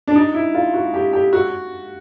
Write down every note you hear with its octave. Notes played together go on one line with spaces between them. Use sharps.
D4
D#4
E4
F4
F#4
G4
G4
F#4